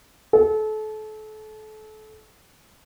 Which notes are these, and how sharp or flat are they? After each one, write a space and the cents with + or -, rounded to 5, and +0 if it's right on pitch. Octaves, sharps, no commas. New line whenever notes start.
A4 -30